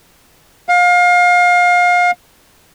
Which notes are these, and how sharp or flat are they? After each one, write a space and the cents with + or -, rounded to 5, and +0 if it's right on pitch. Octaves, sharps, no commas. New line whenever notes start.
F5 +30